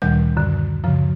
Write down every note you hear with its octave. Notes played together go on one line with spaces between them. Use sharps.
D2 A#2 D#3 G3 G6
F#2 D3
F#2 C#3 F3